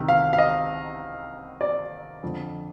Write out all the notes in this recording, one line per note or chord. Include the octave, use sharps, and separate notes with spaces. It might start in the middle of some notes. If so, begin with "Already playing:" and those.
Already playing: C2 C3 D#3
F5
F5
D#5
D5
F2 D3 F3